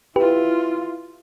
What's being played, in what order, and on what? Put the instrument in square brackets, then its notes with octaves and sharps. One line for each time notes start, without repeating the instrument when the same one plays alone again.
[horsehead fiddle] E4 F4 [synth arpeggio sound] G4 B4